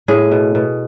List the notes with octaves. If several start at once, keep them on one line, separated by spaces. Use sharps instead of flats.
A2 G#4
B2
B2